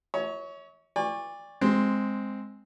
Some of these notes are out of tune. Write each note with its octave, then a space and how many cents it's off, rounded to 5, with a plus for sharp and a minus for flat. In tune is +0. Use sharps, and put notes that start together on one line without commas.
C#5 +15 E5 -45
D5 +0 G#5 -45 C#6 -10
G#3 +0 C4 +0